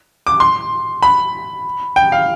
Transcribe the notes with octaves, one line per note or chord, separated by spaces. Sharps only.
D6
C6
B5
G5
F5